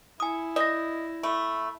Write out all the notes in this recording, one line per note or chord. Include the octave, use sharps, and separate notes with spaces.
E4 G#5 D#6
D5 D#5 A#6
A3 B5